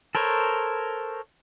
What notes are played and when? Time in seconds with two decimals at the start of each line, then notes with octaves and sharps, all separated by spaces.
0.15 A4 A#4 C5 C#5